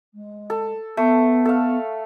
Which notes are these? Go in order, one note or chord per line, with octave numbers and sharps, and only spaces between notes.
G#3
A4
A3 B3
A4 F5